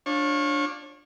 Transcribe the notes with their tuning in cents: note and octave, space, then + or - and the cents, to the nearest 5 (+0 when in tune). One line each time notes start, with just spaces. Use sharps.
D4 +0 F4 +15 C#5 -25